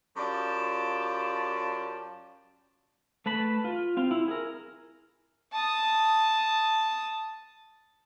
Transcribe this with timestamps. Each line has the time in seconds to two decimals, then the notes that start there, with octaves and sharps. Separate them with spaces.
0.16 F#2 F4 G4 D5 A5
3.26 A3 B4 A5 B5
3.65 F4
3.97 C4 F4
4.11 E4
4.28 G#4 A#4
5.52 A5 D#6